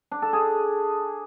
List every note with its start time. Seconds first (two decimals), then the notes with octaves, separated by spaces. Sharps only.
0.11 D4
0.22 A4
0.33 G#4